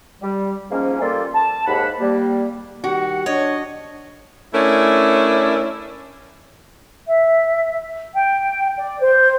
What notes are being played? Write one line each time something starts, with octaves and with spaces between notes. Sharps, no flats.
G3
G#2 F3 G#3 A#3 C#4
G3 A#3 F4 A4
A5
D#2 G#2 F#5 B5
G3 A#3
D#3 G3 F#4 G4 F#5
D4 C#5 D#5
A3 C#4 D4 E4 A#4
E5
G5
D5
C5